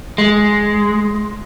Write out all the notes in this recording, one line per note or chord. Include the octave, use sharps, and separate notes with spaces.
G#3